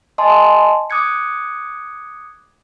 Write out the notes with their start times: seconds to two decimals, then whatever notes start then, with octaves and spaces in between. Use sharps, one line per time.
0.18 D#5 G#5 A5 C6
0.90 D6 D#6 F#6 G#6 C#7